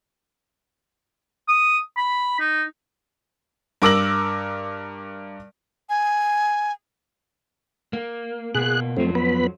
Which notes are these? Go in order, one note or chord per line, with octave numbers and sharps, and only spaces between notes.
D#6
B5
D#4
G2 A#4 D6 E6 A#6 F#7
G#5
A#3
B2 A#3 G#4 F#6
F2 F3 F#3 A3 C4
B3 B5